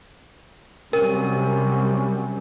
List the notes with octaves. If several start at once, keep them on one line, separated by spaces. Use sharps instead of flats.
C3 F#3 G3 C#4 A#4